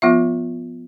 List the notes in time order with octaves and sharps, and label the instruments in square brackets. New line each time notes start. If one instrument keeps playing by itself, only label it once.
[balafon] F3 B3 F4 E5